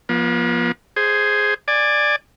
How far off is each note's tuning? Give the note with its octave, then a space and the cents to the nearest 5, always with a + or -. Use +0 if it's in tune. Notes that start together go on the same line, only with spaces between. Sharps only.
F3 +0 B3 -45
G#4 +0 C5 +0
D5 +10 G#5 -10